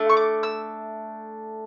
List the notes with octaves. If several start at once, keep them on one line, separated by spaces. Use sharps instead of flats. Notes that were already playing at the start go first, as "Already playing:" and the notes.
Already playing: A3 D4
C#6
D6
E6